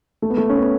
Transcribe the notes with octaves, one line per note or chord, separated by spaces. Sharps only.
A3
B3
A3
C#4
B3